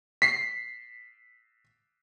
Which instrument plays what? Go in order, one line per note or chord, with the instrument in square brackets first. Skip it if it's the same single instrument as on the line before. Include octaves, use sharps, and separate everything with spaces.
[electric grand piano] B6 C7